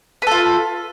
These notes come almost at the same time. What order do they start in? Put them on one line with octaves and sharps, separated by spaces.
B4 A4 F4